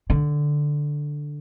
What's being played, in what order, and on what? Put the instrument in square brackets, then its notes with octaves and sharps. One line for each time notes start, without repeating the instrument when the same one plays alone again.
[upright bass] D3